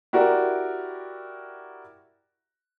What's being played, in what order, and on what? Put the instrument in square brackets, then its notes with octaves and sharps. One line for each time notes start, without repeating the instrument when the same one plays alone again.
[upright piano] E4 F#4 G4 A#4 D5